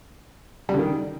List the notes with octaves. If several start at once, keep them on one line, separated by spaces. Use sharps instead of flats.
G3
D3
D#3